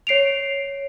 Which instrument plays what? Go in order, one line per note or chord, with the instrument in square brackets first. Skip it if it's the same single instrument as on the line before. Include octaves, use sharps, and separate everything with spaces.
[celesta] C#5 C7 D7 F7